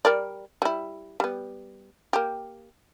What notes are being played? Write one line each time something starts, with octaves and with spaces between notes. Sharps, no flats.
G3 A#4 D5
G3 E4
G3 B3
A#3 G4